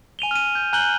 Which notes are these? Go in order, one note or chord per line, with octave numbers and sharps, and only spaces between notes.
G#5 D#7 F7 G7
F6 D#7
G6
G#5 A#5 F#6 G6 F#7 G7